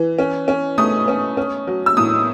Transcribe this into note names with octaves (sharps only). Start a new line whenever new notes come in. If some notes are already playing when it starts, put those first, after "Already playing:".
Already playing: E3
C#4
C#4
A3 D#6
C#4
C#4
F#3
E6
A2 D#6